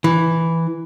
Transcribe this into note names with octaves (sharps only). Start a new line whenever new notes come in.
E3